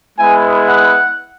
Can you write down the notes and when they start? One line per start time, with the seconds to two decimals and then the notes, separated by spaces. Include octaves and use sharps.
0.19 G#3 B3 E4 G#5
0.67 F#5